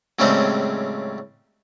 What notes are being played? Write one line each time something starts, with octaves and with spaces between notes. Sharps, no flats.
F#2 A2 C#3 G3 G#3 C4